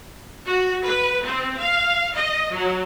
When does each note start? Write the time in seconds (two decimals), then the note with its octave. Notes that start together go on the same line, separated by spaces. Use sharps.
0.46 F#4
0.85 B4
1.25 C4
1.60 F5
2.15 D#5
2.54 F#3